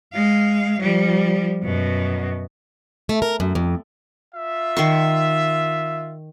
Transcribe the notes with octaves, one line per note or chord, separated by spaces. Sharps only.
G#3 F5
F3 G3
F#2 B2
A3
A#4
F#2
F2
F4 E5
D#3 C6 C#6